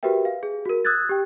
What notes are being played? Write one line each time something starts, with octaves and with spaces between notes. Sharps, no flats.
F#4 G4 A#4 B4 E5 G5
F5
G#4
F#4 A#4
D#6 E6 F#6 G#6 A6
G4 G5